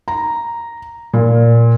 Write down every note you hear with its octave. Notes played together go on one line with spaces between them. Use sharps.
A#5
A#2